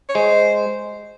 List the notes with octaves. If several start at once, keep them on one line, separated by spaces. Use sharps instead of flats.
C#5
G#3 C5